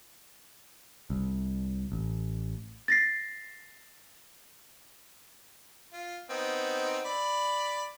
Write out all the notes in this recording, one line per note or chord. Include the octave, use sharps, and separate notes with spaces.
C2
A1
A6 A#6 C7
F4
B3 C4 D#4
D5 B5